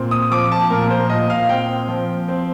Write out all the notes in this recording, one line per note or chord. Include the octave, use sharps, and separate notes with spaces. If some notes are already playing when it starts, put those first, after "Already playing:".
Already playing: A#2 C4
D#6
F3 D6
A5
A#2 A#4
C5
A#2 D#5
F5
C4 G5
F3
C4